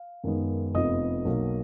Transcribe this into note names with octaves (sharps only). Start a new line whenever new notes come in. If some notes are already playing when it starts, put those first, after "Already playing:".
Already playing: F5
F#2 D#3 G#3 B3
F1 F2 F3 B3 D#5 D#6
B1 B2 F#3 A#3